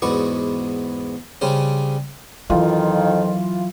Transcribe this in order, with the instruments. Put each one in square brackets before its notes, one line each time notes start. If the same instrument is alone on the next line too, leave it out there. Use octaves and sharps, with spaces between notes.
[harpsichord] E2 G#2 B3 F#4 D5 C#6
C#3 G3 C#4 D4 C5
[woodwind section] F2 D#3 [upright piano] E3 F4 [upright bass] F#3